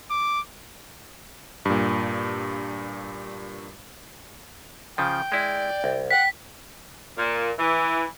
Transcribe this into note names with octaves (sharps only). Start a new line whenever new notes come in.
D6
G2 A#2
C#3 F3 G5
G#3 E4 D5
C2
F#5 G5 B6
A#2
E3